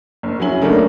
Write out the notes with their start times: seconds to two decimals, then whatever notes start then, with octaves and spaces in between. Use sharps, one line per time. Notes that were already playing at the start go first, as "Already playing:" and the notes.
0.23 F#1
0.40 F#3 C#4 E4 G#5 F#7
0.62 C#3 F#3 A3 A#3 D4 D#4